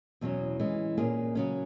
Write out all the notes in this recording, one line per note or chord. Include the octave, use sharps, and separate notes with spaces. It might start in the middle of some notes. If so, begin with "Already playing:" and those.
E2 B2 F#3 C#4
E3 G#3 C#4
A#2 A#3 C#4 G#4
C#3 F#3 C#4